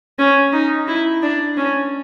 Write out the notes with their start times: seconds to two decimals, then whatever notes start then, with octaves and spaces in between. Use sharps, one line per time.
0.19 C#4
0.53 D#4
0.88 E4
1.22 D4
1.57 C#4